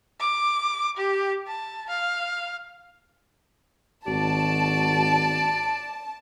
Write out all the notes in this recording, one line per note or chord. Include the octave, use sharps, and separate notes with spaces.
D6
G4
A5
F5
G#1 F#4 D5 A5